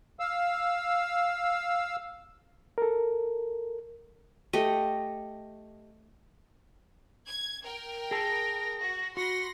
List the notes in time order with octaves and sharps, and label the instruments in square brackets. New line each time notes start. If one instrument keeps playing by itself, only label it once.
[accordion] F5 E6
[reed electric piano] A4 A#4
[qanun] A3 G4 D#5
[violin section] G#6
A#4 G5
[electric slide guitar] G#4 A5 [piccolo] A#6
[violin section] F#4
[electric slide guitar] F#4 [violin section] B5 C6 A#6 [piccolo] C#7